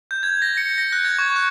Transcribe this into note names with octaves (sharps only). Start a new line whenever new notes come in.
G6
G#6
A#6
C#7
A#6
F#6
G#6
C#6
F#6